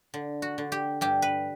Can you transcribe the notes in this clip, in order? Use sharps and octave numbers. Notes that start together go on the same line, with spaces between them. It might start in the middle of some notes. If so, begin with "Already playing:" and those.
D3
F#4
D3
G4
G2 G4
B4